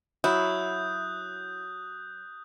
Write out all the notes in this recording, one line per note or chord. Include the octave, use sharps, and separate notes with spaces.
F#3 E4 D#6 F#6 G6